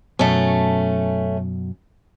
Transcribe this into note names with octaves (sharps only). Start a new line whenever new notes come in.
F#2 B2 A3 C#4